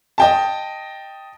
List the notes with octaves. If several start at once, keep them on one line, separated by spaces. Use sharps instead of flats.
D#5 G5 A5